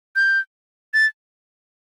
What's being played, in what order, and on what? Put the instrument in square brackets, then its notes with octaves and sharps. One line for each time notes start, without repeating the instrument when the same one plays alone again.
[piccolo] G6
A6